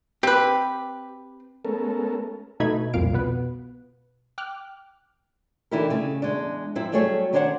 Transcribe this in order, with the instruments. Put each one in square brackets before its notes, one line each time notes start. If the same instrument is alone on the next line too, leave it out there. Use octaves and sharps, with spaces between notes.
[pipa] C4 B4 [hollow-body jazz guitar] G4
[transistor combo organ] G#3 A3 B3 C#4 A4 A#4
[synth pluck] B2 A3 D#4 B5 G#6
C2 F2 A#2 F5 D7
B2 B3 B4
G5 D6 F6 F#6
[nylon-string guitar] D3 E3 D#4 E4 G4 A#4
C#3 A3
E2 G#3 D4
G#2 F3 C4 E4
F#3 G3 A3 G#4 C#5
D#3 D4 C5 C#5 F5 F#5